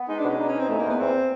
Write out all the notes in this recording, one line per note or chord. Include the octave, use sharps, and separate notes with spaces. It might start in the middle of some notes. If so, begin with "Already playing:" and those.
Already playing: B3
G#3 D#4
D4
B2 C#4
D4 D#4
C#4
D#4
C4
E2 A3
A#3
E2 B3
E2 C4